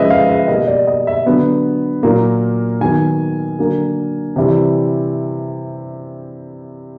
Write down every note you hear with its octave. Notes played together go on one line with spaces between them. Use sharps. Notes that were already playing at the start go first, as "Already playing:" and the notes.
Already playing: C#3 F3 G#3 B4 D#5 E5
F5
E5
B2 G3 A#3 D#5
D5
D#5
E5
D3 F#3 B3
A#2 F#3 A#3
D#3 F#3 B3 G#5
D3 F#3 A#3
C3 E3 G3